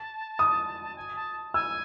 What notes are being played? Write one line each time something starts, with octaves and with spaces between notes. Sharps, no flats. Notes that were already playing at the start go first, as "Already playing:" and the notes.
Already playing: A5
D#6
G#5
A5
G#5 E6